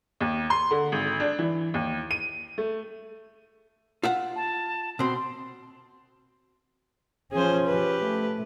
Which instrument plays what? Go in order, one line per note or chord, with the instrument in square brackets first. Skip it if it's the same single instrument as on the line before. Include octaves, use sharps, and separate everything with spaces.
[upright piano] D#2
C6
D3
G#1
D4
E3
D#2
D#7
A3
[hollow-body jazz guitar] F4 E5 F#5
[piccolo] A5
[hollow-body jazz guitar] B2 C4 [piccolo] C6
[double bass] F3 C#4 [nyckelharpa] G#4 C5
[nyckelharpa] G4 B4
[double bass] A3